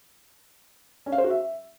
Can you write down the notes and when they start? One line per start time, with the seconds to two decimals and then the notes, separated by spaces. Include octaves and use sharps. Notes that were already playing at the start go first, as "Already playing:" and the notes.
1.06 C#4
1.12 F5
1.18 C5
1.24 F#4
1.30 E5